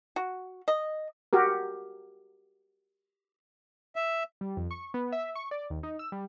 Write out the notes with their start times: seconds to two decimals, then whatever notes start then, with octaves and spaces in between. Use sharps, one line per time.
0.16 F#4
0.68 D#5
1.33 F#4 G4 A#4
3.96 E5
4.41 G3
4.57 F2
4.71 C#6
4.94 B3
5.12 E5
5.35 C#6
5.51 D5
5.70 D#2
5.83 D#4
5.99 E6
6.12 G3